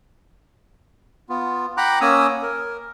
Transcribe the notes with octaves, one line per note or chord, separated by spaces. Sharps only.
B3 F4
F#5 G5 A#5 B5 D6 F#6
A#3 C#4 G#5 D#6 E6
A#4